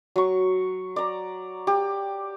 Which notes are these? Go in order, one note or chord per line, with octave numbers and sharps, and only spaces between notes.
F#3 C#6
D5 A#5
G4